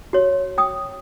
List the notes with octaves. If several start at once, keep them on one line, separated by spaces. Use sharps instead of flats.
F#4 C#5
G5 D#6